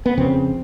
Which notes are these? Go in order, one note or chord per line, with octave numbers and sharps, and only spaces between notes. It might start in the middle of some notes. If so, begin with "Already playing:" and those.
B3
F2 C#3 C4